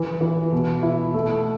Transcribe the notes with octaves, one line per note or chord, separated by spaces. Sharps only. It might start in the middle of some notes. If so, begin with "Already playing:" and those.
Already playing: E3
E3
B2
E4
A3